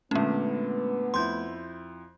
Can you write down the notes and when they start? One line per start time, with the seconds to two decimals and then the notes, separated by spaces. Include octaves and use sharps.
0.11 A#2 D3 G#3 A3 B3 C#4
1.14 F2 E4 C6 G6